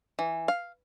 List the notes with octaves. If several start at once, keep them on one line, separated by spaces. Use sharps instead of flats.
E3
F5